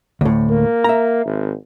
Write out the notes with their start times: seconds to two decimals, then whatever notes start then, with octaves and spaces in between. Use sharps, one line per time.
0.21 D2 A2
0.50 A#3
0.84 E5 A#5
1.25 G#1